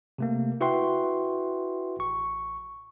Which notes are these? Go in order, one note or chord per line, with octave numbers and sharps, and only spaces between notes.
C3 A3 A#3
E4 F#4 B4 E5 G5 C6
A1 C#6